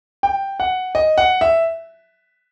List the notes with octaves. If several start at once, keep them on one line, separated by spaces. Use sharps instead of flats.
G5
F#5
D#5
F#5
E5